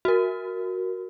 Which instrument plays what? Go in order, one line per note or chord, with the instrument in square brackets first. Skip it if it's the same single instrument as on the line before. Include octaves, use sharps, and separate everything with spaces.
[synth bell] F#4 A#4